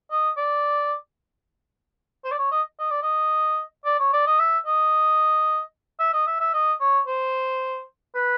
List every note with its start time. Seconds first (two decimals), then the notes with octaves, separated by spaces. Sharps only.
0.11 D#5
0.37 D5
2.25 C5
2.32 D5
2.38 C#5
2.51 D#5
2.79 D#5
2.91 D5
3.03 D#5
3.85 D5
3.99 C#5
4.13 D5
4.27 D#5
4.39 E5
4.66 D#5
6.00 E5
6.13 D#5
6.27 E5
6.40 E5
6.54 D#5
6.80 C#5
7.07 C5
8.15 B4